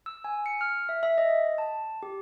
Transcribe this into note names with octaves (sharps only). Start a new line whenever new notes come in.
E6
G#5
C#7
F6
E5
E5
D#5
A5
G4